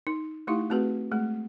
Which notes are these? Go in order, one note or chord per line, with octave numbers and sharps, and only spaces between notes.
D#4
A3 D#4 E4 G4 F5
A3 C4 F#4 G#4 B4
G#3 A3 G#4